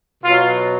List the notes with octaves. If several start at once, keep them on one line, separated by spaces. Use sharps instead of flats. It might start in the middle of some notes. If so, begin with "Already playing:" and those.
B2 F#3 F4